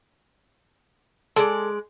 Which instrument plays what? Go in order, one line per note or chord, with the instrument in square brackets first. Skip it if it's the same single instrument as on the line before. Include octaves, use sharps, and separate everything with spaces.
[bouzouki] G#3 D5 [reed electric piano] A4